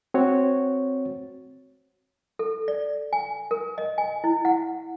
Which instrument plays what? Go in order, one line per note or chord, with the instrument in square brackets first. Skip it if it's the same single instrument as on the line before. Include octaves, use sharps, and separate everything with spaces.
[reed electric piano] C4 F#4 C#5
[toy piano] A4
D5
G#5
A#4
D#5
G#5
E4
F#5